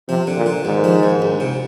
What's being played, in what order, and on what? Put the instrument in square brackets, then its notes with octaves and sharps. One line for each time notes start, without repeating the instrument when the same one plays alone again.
[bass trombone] C3 [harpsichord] F3
[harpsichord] D3
[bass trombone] A#2
[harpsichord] D3
[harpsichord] D#2 [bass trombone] G#2
[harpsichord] F3
D#2
D2
C3